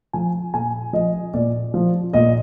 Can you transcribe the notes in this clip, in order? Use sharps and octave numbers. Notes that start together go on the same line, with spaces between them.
F3 G#5
A#2 G#5
F3 D#5
A#2 D5
F3
A#2 D#5